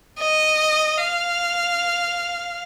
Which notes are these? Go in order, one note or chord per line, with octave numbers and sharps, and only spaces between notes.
D#5
F5